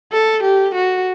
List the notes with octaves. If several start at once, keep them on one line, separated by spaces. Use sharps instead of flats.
A4
G4
F#4